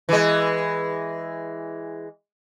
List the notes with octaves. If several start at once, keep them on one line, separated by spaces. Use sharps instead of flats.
E3 G#3